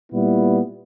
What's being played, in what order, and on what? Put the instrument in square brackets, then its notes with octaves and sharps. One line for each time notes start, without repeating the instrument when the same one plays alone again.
[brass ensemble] A#2 G3 B3 E4